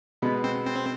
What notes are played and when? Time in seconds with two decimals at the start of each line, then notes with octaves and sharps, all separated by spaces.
0.22 B2 G#3 B3
0.44 C4
0.65 C4